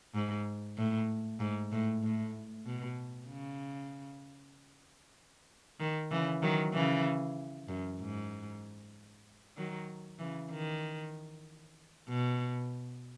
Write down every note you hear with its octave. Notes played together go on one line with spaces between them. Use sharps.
G#2
A2
G#2
A2
A2
B2
C#3
D#3
C#3 E3
D#3 F#3
C#3 E3
F#2
G#2
D#3 F#3
C#3 E3
D#3
B2